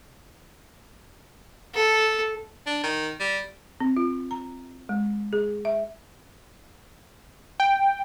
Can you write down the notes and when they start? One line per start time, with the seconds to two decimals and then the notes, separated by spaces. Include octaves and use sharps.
1.74 A4
2.66 D4
2.83 D#3
3.20 G3
3.80 C4
3.97 F4
4.31 A#5
4.89 G#3
5.33 G#4
5.65 E5
7.60 G5